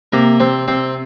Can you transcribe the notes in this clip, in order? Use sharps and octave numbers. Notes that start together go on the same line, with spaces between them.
C3 A#3 A#4
C3 C4 C5
C3 C4 C5